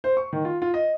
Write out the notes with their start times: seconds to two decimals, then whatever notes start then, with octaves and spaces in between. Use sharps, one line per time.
0.04 C5
0.17 C#6
0.33 D#3
0.45 F4
0.62 F4
0.74 D#5